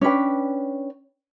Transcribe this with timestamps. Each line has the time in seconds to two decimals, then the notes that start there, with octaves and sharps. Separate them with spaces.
0.01 C#4 D4 B4 G5